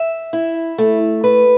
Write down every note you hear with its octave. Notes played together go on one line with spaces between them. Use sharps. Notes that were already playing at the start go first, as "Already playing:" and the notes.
Already playing: E5
E4
A3
B4